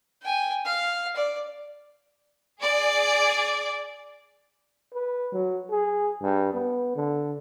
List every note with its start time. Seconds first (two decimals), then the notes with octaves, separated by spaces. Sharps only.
0.22 G5 G#5
0.65 F5
1.16 D5
2.62 G#4 D5
4.94 B4
5.32 F#3
5.70 G#4
6.21 G2
6.54 B3
6.95 D3